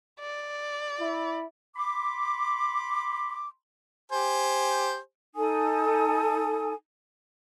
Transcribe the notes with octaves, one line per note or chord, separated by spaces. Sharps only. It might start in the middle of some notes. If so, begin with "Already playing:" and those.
D5
E4
B5 C6 D6
G4 C5 G#5
D#4 A4 G#5 D#6